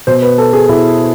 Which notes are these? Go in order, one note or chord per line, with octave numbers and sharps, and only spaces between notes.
B2 C5
B4
A4
G#4
B2 E4